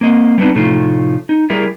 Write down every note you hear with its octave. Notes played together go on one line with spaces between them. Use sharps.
A#3 C4 D#5
G3 B3 C4 D4 D#4
A2 C3 F3 A3 D#4 F4
D#4
G3 E4 G#4 A#4 D5 E5